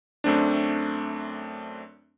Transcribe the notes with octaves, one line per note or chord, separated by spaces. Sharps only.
F#2 A3 C4 D4